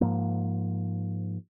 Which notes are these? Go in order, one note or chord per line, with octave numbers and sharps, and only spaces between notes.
G#2 F3 A#3